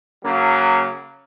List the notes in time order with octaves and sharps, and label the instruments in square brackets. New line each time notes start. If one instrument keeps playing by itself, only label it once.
[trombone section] C#3 F#3 A#3